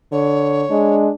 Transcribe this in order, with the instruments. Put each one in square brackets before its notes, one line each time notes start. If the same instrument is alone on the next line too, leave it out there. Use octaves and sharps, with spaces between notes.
[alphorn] D3 [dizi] C#5
[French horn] G#3 [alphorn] D4